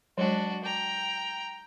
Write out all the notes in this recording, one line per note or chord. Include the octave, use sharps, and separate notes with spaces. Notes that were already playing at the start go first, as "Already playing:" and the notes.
F#3 G#3 D4 F#4
G5 A#5